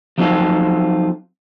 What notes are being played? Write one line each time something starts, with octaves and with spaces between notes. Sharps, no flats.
F3 F#3 C4 D#4 F4 A4